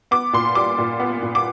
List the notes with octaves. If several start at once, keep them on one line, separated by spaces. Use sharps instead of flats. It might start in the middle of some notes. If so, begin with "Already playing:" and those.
B3 D6
A#2 C6
G3 D6
A#2
B3
A#2
D6